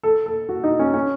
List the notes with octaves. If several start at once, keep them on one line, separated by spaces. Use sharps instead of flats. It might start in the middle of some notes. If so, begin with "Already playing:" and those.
A4
A4
F#4
D#4
C#4
C#4